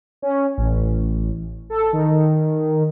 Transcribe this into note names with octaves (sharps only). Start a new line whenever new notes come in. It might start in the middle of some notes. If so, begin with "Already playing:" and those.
C#4
A1
A4
D#3